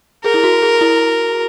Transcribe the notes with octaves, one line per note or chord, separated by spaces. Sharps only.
G#4 A#4
E4
F#4
G#4
E4